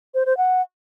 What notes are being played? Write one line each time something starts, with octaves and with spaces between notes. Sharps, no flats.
C5
C5
F#5